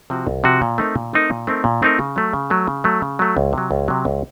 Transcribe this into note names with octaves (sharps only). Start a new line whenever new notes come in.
C3 F3 C4 F#4
C2
C3 F3 C4 F#4
A#2
A3 C4 D#4 A#4
A#2
A3 C4 D#4 A#4
A#2
A3 C4 D#4 A#4
A#2
A3 C4 D#4 A#4
C#3
F#3 A3
C#3
F#3 A3
C#3
F#3 A3
C#3
F#3 A3
C#2
C3 F#3
C#2
C3 F#3
C#2